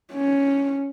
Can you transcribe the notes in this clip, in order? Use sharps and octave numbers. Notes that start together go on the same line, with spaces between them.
C#4